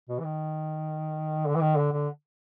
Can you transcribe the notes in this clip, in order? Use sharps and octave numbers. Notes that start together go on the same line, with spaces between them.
B2
E3
D#3
D3
E3
D#3
D3
D3